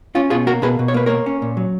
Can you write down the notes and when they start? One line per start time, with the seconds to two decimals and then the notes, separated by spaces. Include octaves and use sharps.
0.15 C#4 F4
0.30 B2 F4 G#4
0.47 A#3 F#4 A#4
0.62 B2 G#4 B4
0.79 B2
0.88 C#5
0.94 A#3 B4
1.06 A#3 A#4 C#5
1.26 C#4
1.42 A#2
1.57 F#3